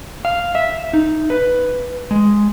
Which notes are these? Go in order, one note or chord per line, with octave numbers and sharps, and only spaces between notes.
F5
E5
D#4
B4
G#3